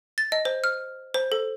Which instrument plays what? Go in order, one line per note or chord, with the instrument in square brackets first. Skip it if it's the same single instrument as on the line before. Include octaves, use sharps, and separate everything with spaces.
[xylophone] A6
D#5
C5
F6
C5
A4